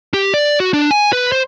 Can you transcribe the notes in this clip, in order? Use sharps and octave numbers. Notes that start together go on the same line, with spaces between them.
G4
D5
F#4
D4
G#5
B4
C5